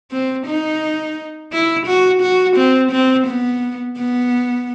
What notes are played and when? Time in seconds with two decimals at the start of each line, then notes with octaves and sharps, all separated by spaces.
0.11 C4
0.46 D#4
1.52 E4
1.86 F#4
2.22 F#4
2.56 C4
2.92 C4
3.27 B3
3.97 B3